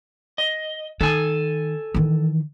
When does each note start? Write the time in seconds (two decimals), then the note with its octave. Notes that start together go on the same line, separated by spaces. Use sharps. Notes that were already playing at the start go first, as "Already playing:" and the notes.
0.38 D#5
1.01 D#3 A4 G#5
1.94 D#3 E3